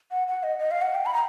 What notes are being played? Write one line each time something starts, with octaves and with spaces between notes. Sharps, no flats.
F#5
F#5
D#5
D#5
F5
F#5
G5
B5
A#5